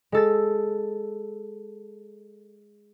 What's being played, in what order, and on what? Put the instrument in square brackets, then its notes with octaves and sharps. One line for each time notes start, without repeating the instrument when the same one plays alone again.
[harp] G#3 A4 A6